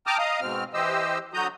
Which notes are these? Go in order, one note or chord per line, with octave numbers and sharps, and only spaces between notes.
G5 A5 A#5 D6 D#6 F6
D#5 F5 A#5 D#6
G#2 B2 C4 F6
E3 G4 C5 D#5 E6
D3 F#3 F#4 A#5 D#6 G6